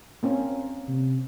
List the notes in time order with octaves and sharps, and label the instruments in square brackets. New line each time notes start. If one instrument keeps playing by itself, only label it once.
[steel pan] A#3 C4 C#4
[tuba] C3